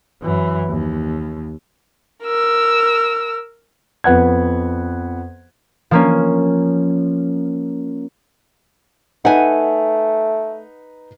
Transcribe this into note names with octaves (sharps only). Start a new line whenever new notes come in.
F#2 E3
D#2
A#4 E6
F2 B3 F#5 G#6
F3 A#3 C#4
A3 D#4 B4 F#5 G#5